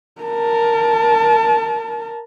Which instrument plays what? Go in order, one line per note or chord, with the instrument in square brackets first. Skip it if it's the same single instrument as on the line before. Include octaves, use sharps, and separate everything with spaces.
[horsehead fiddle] A#4 A5